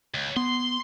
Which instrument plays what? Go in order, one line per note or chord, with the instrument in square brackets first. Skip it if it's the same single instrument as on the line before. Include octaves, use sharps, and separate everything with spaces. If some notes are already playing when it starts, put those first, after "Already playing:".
[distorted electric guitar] C#2
[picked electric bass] B3 [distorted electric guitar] C6